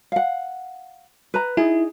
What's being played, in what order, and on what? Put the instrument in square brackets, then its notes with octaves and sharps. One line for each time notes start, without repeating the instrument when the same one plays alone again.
[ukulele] F5 F#5
B4 A#5
[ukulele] D#4 G#4 [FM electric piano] E4